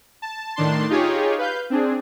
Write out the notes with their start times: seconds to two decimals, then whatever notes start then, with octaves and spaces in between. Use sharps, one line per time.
0.22 A5
0.56 A2 D#3 D4 A5 C6
0.89 D#4 F4 G4 G#4 C#5
1.38 B4 F5 G6
1.70 C4 D4 G#4